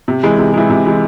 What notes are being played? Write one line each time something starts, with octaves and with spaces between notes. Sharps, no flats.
C3
E3 G#3
C3
E3 G#3
C3
E3 G#3